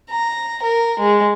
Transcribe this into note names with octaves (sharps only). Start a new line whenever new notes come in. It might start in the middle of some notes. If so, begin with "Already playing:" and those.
A#5
A#4
G#3